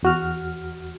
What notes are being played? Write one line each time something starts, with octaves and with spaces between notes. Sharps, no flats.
E2 F#4 F6